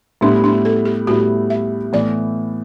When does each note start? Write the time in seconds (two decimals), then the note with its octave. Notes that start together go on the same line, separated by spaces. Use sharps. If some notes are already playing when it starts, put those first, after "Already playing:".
0.21 A2 G3 B3 D4 E4
0.44 D4
0.65 A4
0.85 G4
1.07 A2 G3 B3 E4 F#4
1.50 E5
1.93 A2 E3 B3 D5